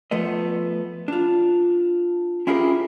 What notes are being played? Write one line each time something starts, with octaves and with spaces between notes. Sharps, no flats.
F3 A3 B3 D#5
D4 F4
C#4 E4 F4 G4 G#4 A#4